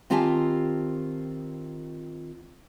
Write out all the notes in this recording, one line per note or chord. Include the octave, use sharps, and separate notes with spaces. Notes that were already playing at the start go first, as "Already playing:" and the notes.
D#3 C4 F4 G4 G#5 A5